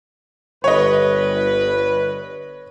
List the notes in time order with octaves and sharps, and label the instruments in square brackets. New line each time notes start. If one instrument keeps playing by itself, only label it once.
[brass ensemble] G1 B4 [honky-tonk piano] C#5 D#5